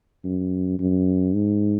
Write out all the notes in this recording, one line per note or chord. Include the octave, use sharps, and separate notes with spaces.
F#2
F#2
G#2